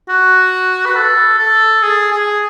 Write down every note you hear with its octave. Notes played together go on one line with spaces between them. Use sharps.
F#4
B4
A4
A4
G#4
G#4